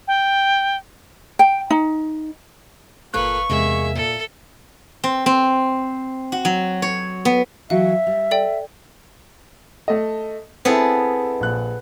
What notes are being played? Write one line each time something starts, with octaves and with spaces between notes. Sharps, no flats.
G5
G5
D#4
G1 A#2 A4 B4 F5 C#6 F#6
E2 C3 G#3 A#3 G#4 E5
A#2 A4
C4
C4
F#4
F#3
C#5
B3
E3 F#3 F#4 E5 F5
G3
A4 D5 G5
A3 A4 D#5
B3 C4 E4 G#4 A4
A#1 F#6